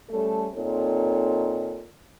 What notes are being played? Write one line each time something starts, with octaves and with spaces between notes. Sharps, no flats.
G3 A3 C#4 A4
A#2 C4 D#4 A4 C#5